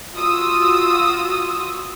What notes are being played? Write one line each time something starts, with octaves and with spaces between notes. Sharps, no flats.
F4 F#4 D#6 E6